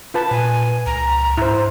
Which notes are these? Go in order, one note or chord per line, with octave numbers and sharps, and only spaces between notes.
F4 B4 A5
A#2 G#5
C#2 A#5
G#2 E4 C5